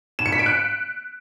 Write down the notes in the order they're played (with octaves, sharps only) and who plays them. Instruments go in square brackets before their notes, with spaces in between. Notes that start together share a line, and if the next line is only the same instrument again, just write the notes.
[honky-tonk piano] E7
C#7
B6
D7
F#6